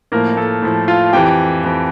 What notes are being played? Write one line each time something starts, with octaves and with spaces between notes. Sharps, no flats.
A2 F3 A#3 A#4
A3 A4
A2 F3
F4 F5
F2 E3 G4 G5
F2 E3